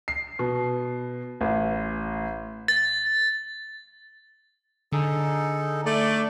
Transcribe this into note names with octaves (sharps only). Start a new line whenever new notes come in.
C7
B2
A1
A6
D3 D#4 G#4 A4
A3 D5